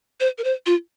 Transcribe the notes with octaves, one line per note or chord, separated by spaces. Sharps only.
C5
A#4
C5
F4